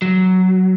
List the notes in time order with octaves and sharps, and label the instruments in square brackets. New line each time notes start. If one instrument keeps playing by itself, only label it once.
[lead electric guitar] F#3